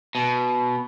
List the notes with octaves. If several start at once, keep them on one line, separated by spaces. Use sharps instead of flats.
B2